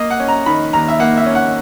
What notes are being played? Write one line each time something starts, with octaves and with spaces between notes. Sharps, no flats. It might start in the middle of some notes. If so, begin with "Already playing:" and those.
Already playing: A#3 D#5
F#5
C#4
A#5
D#3 B5
D#2 A#5
E5
A#3 F#5
E5
C#4
F#5